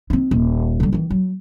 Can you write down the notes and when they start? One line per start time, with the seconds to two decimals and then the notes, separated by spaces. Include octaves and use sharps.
0.10 C4 D#4
0.31 D#1
0.80 D3 G3
0.93 D#3 E3
1.10 F#3